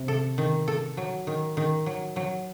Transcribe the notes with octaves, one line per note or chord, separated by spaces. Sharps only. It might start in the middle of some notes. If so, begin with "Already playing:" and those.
Already playing: C3
A4
D#3
A4
F#3
D#3
D#3
F#3
F#3